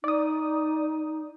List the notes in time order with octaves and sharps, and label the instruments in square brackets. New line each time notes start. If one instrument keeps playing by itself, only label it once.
[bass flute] D#4 [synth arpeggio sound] D5 D#6